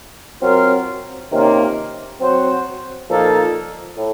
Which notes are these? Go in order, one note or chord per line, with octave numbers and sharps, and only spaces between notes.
F#3 C4 F4 A#4
C3 D#3 A#3 C#4 F4
F#3 C4 F#4 C5
A#2 F3 A#3 D#4 A4
A2